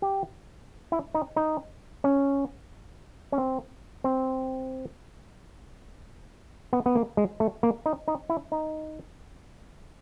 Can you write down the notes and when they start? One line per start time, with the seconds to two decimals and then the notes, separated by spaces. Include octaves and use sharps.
0.02 G4
0.92 E4
1.15 D#4
1.36 D#4
2.04 C#4
3.32 C#4
3.38 C4
4.04 C4
6.73 B3
6.86 B3
6.95 A#3
7.17 G#3
7.40 A3
7.63 A#3
7.86 D#4
8.08 D#4
8.30 E4
8.52 D#4